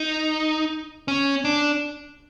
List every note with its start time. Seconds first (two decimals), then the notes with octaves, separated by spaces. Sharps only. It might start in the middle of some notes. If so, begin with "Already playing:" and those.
Already playing: D#4
1.08 C#4
1.45 D4